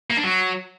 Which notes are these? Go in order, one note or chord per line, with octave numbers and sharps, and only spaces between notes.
A#3
D4
F#3